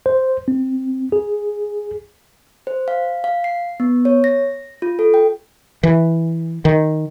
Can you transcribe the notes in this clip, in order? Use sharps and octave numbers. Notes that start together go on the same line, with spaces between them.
C5
C4
G#4
C5
F5
F5
C7
B3
C#5
A#6
F4
A4
G5
E3
D#3